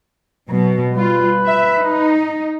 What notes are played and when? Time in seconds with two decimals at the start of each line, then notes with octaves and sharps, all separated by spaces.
0.50 B2 F#3
0.95 G3 F4 B4
1.47 E5
1.79 D#4